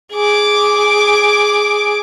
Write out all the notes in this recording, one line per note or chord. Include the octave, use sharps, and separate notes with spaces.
G#4 D6